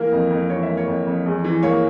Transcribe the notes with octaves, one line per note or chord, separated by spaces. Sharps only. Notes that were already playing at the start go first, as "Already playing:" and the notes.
Already playing: E3 A#3 A#4
F2
F2
E3 C#5
E5
A#3
C#5
F2
F2
E2
E3
A#3 C#5